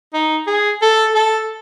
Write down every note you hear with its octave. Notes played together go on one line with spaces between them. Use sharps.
D#4
G#4
A4
A4